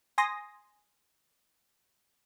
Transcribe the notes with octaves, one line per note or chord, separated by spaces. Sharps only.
G#5 C6 D#6 A#6